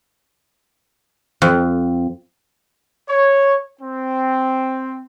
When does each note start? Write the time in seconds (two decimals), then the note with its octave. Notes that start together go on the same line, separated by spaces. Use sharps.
1.42 F2
3.09 C#5
3.81 C4